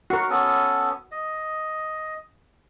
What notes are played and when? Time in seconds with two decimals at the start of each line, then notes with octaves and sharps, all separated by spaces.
0.10 F#4 A#4
0.30 B3 C#4 A4
1.12 D#5